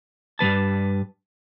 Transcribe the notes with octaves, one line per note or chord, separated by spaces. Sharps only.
G2 F3 B4 A5